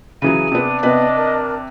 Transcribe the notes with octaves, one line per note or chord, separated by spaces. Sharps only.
C#3 E3 F#3 G#4 D#7
C3 B3 D4
C3 B3 B4 D#5 F#6
A#4